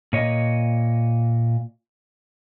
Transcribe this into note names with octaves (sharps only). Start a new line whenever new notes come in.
A#2 C#5 D#5